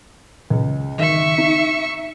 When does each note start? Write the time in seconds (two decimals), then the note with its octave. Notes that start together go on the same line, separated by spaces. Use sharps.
0.50 C#2
0.98 G#1 E5 C#6
1.38 D#4